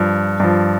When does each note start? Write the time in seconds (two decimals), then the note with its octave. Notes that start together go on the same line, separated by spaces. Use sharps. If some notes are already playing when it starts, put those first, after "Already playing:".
Already playing: G2 F3
0.40 G2 F3